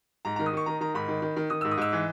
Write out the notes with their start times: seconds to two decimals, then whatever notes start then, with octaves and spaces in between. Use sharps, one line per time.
0.25 G#2 A#5
0.36 A#5
0.39 D#3
0.46 D#6
0.53 D#3 C#6
0.66 D#3 A#5
0.81 D#3 A#5
0.94 G#2 B5
1.08 D#3
1.22 D#3
1.36 D#3
1.50 D#3 D#6
1.61 E6
1.64 G#2
1.71 D#6
1.77 G#2 E6
1.93 E3